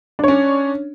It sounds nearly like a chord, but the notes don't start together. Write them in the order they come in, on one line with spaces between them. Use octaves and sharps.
D4 C#5 C#4